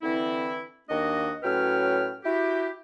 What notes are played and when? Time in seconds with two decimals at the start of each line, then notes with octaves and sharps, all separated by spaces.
0.03 D3 E3 C4 E4
0.89 D#2 D#3 A#3 D4 F#4 D#5
1.43 A2 F#3 C#4 B4 G5 F6
2.24 E4 F#4 G4